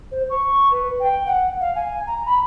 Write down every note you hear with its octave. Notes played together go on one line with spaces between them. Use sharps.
C5
C#6
B4
G5
F#5
F5
G#5
A#5
B5